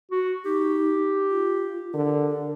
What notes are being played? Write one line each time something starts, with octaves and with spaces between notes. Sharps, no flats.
F#4
D#4 G4
F4
D3 A#4